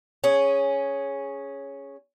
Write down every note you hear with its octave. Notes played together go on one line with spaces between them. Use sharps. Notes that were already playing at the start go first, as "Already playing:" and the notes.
C#4 G#4